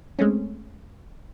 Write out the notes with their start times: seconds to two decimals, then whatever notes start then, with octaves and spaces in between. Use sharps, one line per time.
0.19 G#3 A3 C4 C#4